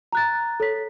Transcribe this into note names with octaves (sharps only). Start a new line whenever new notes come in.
A#5 F#6 A6
A4 C#5 B6